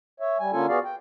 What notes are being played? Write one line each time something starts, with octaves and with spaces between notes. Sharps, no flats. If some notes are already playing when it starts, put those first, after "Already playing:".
C#5 E5
G3 G#5
D3 A#3 C#4 F4 A4 G#5
B3 F#4 G#4 D5 F5
G5